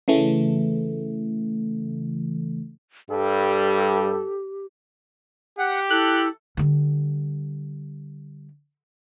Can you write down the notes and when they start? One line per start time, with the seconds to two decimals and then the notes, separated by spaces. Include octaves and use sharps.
0.08 C#3 E3 A3
3.10 G2 G3 G4 A4
5.59 G4 F#5
5.90 E4 A4 F#6
6.57 D3 G3